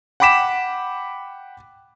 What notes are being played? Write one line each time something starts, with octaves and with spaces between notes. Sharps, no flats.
F#5 G5 B5 D6 B6 E7